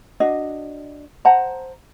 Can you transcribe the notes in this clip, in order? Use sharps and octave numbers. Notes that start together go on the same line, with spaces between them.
D4 F#4 D#5
C5 F#5 A5 A#5